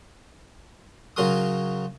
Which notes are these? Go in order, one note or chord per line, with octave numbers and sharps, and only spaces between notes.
C#3 F#3 A#4 C6 D#6